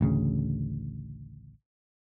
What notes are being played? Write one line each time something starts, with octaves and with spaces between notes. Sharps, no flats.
A1 D2 C#3